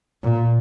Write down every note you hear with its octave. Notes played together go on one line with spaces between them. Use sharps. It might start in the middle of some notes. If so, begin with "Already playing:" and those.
A#2